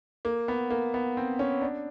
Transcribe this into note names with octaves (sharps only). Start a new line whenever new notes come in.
A#3
B3
A#3
B3
C4
C#4
D4